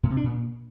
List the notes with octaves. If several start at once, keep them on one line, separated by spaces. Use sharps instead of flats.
A2
C3
D4
A#2